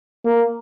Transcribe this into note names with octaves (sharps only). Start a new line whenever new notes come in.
A#3